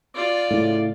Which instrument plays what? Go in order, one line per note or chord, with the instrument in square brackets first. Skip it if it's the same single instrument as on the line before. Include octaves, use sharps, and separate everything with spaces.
[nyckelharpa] F4 D5
[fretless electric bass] A2 C#3